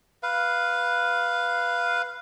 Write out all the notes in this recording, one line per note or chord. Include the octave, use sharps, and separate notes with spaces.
B4 F5